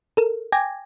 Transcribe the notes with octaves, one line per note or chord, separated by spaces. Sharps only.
A4 A#4
G5 G#5 D6 G#6 A#6